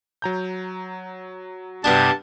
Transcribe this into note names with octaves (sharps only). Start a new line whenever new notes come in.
F#3 A#5 G6
G2 C3 G3 B3 D4 A5 G#6